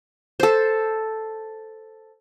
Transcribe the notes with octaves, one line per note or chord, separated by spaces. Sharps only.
A4 C5